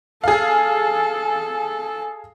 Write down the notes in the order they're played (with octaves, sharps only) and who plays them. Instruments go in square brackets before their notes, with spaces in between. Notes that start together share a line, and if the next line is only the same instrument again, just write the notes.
[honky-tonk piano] G#4 F5 [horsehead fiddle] A4